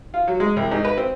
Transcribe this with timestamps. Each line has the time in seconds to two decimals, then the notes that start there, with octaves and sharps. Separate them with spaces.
0.14 F4
0.28 F#3
0.40 G#3
0.56 C2
0.71 G#2
0.84 B4
0.97 C4